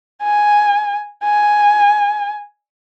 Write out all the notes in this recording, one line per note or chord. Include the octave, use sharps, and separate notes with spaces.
G#5
G#5